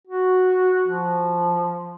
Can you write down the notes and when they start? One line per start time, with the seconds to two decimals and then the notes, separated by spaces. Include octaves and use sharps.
0.07 F#4
0.88 F3